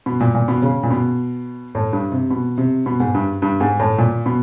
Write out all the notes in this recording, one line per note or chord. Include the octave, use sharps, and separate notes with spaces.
B2
A#2
A#2
B2
C#3
A#2
B2
A2
G2
C3
B2
C3
B2
G#2
G2
G2
G#2
A2
A#2
B2